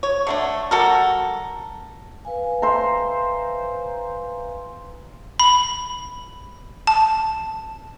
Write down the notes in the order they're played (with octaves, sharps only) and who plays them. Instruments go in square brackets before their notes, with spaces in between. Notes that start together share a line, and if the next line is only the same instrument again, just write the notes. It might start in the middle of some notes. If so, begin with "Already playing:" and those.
[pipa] C#5
D3 A3 D4
G3 F#4 A4 A#4
[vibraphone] B4 F5 G#5
[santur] C5 E5 A#5
[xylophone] B5
A5